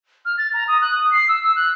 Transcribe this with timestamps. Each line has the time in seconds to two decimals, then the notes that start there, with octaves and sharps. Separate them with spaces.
0.25 F6
0.37 A6
0.53 A#5
0.67 D#6
0.81 F#6
0.95 D#6
1.11 C7
1.28 E6
1.43 E6
1.55 F#6